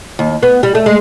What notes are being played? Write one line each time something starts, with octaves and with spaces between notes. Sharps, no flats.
D#2
B3
G3
A3
G#3